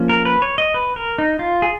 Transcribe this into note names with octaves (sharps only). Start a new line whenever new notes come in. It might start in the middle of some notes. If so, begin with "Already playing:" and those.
Already playing: F3 A#3 C#4
A#4
B4
C#5
D#5
B4
A#4
D#4
F4
G#4